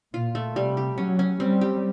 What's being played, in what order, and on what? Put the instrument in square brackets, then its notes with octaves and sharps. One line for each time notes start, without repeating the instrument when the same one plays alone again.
[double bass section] A#2 [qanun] F4
[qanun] A3
[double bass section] C3 [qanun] G3
[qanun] G4
[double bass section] F#3 [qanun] C#4
[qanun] C#4
[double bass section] G3 [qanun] C4
[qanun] G4